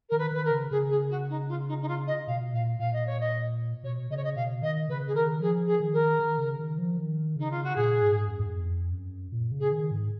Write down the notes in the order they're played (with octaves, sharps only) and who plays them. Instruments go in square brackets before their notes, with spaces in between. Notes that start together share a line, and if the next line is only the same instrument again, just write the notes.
[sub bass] D#3 [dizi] A#4
[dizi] B4
[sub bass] D#3 [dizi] B4
[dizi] A#4
[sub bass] C#3
[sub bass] C#3 [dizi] G#4
[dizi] G#4
F#4
D#4
F4
D#4
D#4
F4
D#5
[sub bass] B2 [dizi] F5
[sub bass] A#2 [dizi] F5
[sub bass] A#2 [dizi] F5
[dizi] D#5
C#5
D#5
[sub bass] B2 [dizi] C#5
[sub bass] C#3 [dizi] D#5
[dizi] C#5
D#5
[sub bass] B2 [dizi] F5
[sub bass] D#3 [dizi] D#5
[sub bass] C#3 [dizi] B4
[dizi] G#4
[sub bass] D#3 [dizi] A#4
[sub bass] F3 [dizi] G#4
[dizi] G#4
[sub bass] D#3
[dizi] A#4
[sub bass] D#3
C#3
D#3
F3
D#3
[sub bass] C#3 [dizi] D#4
[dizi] F4
F#4
[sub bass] A#2 [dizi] G#4
[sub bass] G#2
F#2
G#2
F#2
F2
F#2
A#2
C#3
[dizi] G#4
[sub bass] D#3
G#2